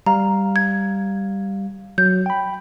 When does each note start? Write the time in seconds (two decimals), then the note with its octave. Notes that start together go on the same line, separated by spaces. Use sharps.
0.06 G3 F5 A#5
0.56 G#6
1.98 F#3 G6
2.26 G5 B5